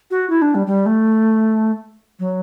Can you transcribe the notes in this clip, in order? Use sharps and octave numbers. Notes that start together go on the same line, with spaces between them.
F#4
E4
D4
G3
G3
A3
F#3